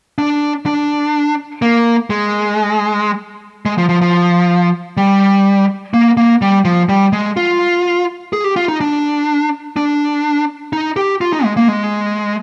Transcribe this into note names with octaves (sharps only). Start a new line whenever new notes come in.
D4
D4
A#3
G#3
G#3
F3
F3
F3
G3
A#3
A#3
G3
F3
G3
G#3
F4
G#4
G4
F4
D#4
D4
D4
D#4
G4
F4
D#4
G#3
A#3
G#3